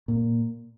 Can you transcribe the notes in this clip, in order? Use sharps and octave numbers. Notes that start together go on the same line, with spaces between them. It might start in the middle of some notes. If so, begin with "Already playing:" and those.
A#2